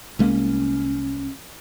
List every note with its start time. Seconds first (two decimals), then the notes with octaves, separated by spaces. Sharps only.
0.19 C2 G#3 A#3 C#4